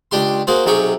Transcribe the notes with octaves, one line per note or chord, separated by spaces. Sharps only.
C#2 D4 G4 C6
A#3 F#4 G#4 C5
B1 C3 F#3 G#4 G5 C#6